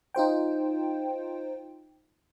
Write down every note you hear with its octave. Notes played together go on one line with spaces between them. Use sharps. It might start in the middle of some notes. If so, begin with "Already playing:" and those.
D#4 F4 C5 G5